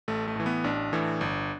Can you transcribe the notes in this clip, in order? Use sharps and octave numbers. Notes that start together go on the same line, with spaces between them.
A1 A3
A3
A2 E3
B3
A1 D4
A2 E3
G1